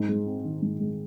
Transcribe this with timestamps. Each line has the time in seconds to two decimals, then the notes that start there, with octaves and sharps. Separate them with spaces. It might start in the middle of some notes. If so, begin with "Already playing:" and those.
Already playing: G#2
0.09 G#3
0.26 C4
0.45 D#3
0.62 G#2
0.80 G#3